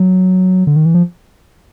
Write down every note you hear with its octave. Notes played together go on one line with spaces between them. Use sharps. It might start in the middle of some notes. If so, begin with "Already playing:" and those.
Already playing: F#3
D3
D#3
E3
F3